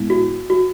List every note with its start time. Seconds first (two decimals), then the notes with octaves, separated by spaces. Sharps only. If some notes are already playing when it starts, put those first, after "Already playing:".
Already playing: A2 G#3 B3 E4
0.10 F#4
0.50 F#4